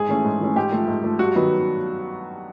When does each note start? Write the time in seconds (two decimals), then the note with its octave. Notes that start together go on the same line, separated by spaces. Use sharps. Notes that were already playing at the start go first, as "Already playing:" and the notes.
Already playing: G#2 G#4
0.09 E3 A3 C#4
0.25 G#2
0.41 E3 A3 C#4
0.56 G#2 G4
0.72 F3 A3
0.88 G#2
1.03 F3 A3
1.19 G2 F#4
1.35 D#3 F#3 B3